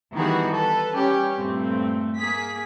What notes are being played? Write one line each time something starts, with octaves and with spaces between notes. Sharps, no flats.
D#3 E3 G3 B3 F#4 G#4
A4 B4
G3 C#4 G4
G2 A#2 A3 C4
A#3 G#4 B6